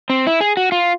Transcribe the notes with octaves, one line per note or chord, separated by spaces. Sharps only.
C4
E4
G#4
F#4
F4